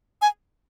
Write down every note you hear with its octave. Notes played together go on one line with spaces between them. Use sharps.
G#5